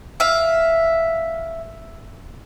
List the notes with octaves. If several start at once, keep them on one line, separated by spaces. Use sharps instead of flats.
E5 F5